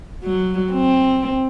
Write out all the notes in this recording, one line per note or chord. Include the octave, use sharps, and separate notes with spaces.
F#3
C4